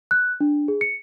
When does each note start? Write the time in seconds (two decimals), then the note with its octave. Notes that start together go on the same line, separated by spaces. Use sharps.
0.11 F#6
0.41 D4
0.68 G#4
0.81 C#7